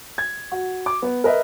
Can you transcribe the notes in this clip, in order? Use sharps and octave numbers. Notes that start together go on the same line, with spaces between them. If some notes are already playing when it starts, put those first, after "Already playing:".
G#6
F#4
D6
B3
A#4 B4 D#5 E5